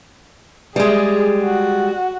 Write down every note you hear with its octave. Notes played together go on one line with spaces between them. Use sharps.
G3 G#3 G#4
F#4